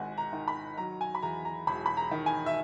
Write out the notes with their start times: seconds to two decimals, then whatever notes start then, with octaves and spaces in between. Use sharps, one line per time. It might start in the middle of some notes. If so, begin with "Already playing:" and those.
Already playing: G#1 G#2 F#5 G#5
0.18 A#5
0.33 D#3
0.48 B5
0.78 F#3 A#5
1.01 G#5
1.15 B5
1.22 E2 A#5
1.45 A#5
1.67 E1 B5
1.86 B5
1.97 A#5
2.11 D#3
2.26 G#5
2.46 E5